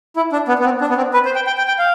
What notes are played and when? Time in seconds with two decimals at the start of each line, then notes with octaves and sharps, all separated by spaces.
0.16 E4
0.32 D4
0.48 B3
0.59 B3
0.65 C4
0.81 D4
0.89 B3
0.97 C4
1.14 B4
1.25 C5
1.35 G5
1.47 G5
1.58 G5
1.68 G5
1.79 F5